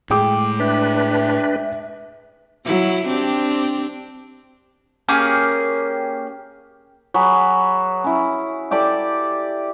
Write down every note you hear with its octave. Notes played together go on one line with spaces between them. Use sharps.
A2 G#3 G5 D6
D4 B4 E5
F#3 E4
C4 D4 G4
A#3 C#4 G4 G#4
F#3 G#4 B4
C#4 E4
E4 G4 A4 D5